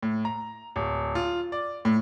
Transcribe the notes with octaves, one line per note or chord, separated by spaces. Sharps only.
A2
A#5
D1
F4
D5
A2